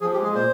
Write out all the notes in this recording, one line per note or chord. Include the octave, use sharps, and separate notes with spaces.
F3 G#4
G4
G#3
G#4
A#2 C5